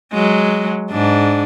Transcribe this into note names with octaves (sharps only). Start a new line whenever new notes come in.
F#3 G#3
G#2 D4